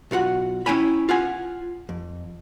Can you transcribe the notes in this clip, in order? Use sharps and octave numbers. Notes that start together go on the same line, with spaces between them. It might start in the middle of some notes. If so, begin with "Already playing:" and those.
B1 F4 F#4 F#5
C#4 E4 G5 G#5 B5
F4 F#5 G#5
F2